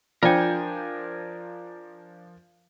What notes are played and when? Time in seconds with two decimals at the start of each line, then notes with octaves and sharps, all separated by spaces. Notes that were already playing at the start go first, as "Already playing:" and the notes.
0.23 F3 D4 F4 A#4 G5 G#5 G6